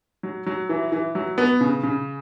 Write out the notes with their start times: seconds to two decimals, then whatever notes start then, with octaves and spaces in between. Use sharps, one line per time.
0.23 F#3
0.47 F#3
0.69 E3
0.92 E3
1.15 F#3
1.38 B3
1.61 C#3
1.83 C#3